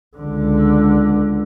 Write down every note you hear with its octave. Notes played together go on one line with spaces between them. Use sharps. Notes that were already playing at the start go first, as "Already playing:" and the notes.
C#2 D3